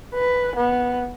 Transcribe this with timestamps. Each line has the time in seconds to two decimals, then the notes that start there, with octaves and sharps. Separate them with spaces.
0.14 B4
0.56 B3